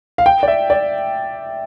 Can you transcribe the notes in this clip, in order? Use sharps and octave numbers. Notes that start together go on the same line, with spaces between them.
F5
G5
D5
E5
D5